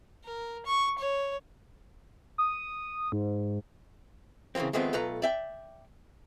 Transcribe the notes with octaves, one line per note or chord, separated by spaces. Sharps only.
A#4
C#6
C#5
D#6
G#2
C#3 E3 F3 A#3 C4
D#3 F3 G#3 A3 B3 C4
B1 A3 F4 B4 A#5
D5 E5 G5